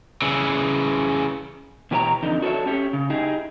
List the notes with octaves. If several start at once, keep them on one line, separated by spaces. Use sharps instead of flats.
C#3 E3
B2 E3 G4 C#5 A5 A#5
F2 D3 E3 D#4
F#4 A4 A#4 C#5 E5
C#4 G4 C#5
C#3
D#4 E4 G4 G#4